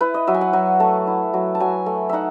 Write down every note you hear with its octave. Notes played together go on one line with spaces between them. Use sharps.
E4 B4
D#5
F#3 E5
G#5
F#5
F#3 G#5
A3 A5
E4
F#3
A5
F#3 G#5
A3
D#4 E5 F#5